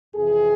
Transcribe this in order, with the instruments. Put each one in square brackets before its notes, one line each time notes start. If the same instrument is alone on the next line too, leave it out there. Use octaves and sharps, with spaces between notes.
[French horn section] F2 C3 E3 G#4